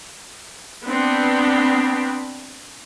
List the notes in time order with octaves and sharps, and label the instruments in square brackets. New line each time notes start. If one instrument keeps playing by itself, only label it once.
[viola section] B3 C4 D4